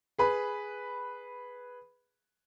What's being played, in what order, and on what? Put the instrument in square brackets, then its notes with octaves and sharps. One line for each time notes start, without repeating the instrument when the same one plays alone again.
[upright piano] G#4 B4 B5